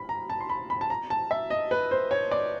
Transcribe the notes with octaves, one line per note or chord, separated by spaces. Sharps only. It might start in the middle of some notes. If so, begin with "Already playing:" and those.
Already playing: B5
A#5
A5
C6
B5
B5
A5
A#5
A5
E5
D#5
B4
C5
C#5
D5